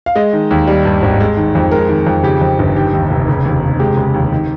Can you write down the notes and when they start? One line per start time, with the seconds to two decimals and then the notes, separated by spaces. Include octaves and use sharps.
0.06 F5
0.16 G#3 D#5
0.33 D#3
0.51 D#2
0.67 G3
0.85 G2
1.02 G#1
1.20 G#3
1.37 D#3
1.55 F2
1.71 G#3 A#4
1.89 D#3
2.06 F2
2.23 C#3 G4
2.41 F2
2.59 G1
2.75 D#3 G4
2.93 D#2
3.11 F1
3.29 C#3
3.45 D#2
3.63 F1
3.80 G#3 G4
3.97 C#3
4.14 D#2
4.32 D#3